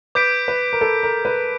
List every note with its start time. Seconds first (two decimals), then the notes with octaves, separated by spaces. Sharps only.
0.15 B4 D6 G6 B6 D7
0.48 B4
0.73 A#4
0.81 A4
1.03 A#4
1.25 B4